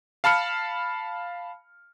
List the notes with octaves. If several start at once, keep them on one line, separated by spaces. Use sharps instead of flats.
F5 A5 B5 F6 C#7